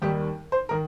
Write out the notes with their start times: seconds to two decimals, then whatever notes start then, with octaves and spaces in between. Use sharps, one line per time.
0.02 D#2 D#3 G3 G4
0.52 C5
0.69 D#3 A#4